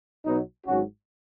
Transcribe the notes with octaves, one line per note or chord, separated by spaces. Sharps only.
B1 B2 F#3 B3 D#4
G#1 G#2 F#3 C#4 F#4